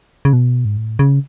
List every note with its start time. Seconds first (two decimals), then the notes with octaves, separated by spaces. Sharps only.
0.25 C#3
0.33 B2
0.65 G#2
0.77 A2
0.99 C#3